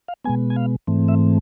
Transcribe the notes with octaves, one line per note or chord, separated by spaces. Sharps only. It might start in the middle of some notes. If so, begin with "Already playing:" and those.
F5
B2 G#3 B3 G#5
G#5
F5
G#2 E3 A3 C4
E5